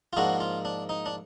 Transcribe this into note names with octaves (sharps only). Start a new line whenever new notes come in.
F4
G#2 F3 A#3 D4 F#4
F4
D4
D#4
D4